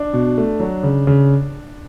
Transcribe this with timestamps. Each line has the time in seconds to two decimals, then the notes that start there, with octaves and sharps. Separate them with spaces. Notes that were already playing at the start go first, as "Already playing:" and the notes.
Already playing: D4
0.13 B2
0.38 A3
0.60 F#3
0.83 C#3
1.07 C#3